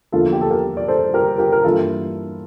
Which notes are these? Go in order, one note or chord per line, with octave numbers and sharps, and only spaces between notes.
E2 D3 F3 A#3 E4 F4 A4
G4
A4
G4 A#4
D5
A4 C5
G4 A#4
G4 A#4
A#4
G2 E3 A#3 E4 F4 A4